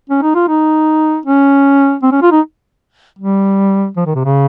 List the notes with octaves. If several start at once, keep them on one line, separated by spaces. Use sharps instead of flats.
C#4
D#4
F4
D#4
C#4
C4
C#4
F4
D#4
G3
F3
D#3
C3
C#3